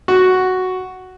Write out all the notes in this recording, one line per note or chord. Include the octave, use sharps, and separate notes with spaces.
F#4